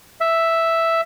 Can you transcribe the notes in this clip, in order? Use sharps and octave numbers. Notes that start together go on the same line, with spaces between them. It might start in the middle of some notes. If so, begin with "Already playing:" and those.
E5